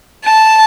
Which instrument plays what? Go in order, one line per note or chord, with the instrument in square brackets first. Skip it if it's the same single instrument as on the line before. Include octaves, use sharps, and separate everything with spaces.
[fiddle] A5